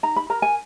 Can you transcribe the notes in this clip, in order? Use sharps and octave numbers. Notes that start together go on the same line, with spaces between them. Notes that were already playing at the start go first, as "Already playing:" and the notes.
D#4 A#5
B5
A#4 A#5
G#5